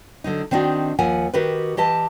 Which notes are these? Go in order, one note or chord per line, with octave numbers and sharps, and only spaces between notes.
D3 F#3 D#4
D#3 C4 D4 D#4 F#4
D#2 F3 F#5 G#5
D#3 F#4 G4 B4
E3 G4 D#5 A5